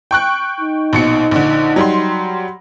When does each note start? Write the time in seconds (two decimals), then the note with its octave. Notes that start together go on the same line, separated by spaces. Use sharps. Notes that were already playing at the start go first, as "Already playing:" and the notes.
0.11 G5 C#6 F#6
0.60 D#4
0.93 A#1 B2 C#7
1.31 A#1 D3
1.76 F#3 G3 C6